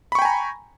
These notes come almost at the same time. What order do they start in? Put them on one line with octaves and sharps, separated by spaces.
B5 C#6 G5 G#5 A#5